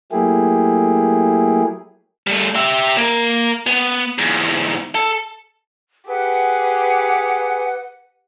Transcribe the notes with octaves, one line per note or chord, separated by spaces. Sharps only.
F#3 A3 A#3 E4 G4 G#4
G3 A3
G4 E5
A#3 A#4
B3
E2 G#2
A4
G4 G#4 B4 F#5